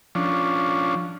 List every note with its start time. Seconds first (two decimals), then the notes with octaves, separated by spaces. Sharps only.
0.15 F3 C#4 D4